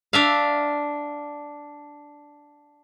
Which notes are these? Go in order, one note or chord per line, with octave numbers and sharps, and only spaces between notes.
D4 E5 F5